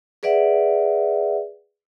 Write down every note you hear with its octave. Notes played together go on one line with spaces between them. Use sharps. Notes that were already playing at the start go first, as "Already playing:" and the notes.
G#4 B4 D5 E5 F#5